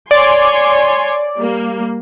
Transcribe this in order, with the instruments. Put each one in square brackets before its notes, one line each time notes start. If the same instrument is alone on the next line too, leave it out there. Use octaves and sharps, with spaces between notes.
[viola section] C#5 G#5 C6 [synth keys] D5
[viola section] G3 A#3